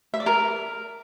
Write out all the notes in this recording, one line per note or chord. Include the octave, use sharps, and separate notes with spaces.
E5
D5
A#4